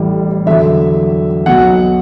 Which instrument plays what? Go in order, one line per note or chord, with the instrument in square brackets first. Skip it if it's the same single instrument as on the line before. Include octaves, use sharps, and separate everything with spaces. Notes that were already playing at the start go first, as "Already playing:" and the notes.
Already playing: [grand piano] A1 A2 E3 G3
E2 D3 F#3 E5
B1 B2 F#3 F#5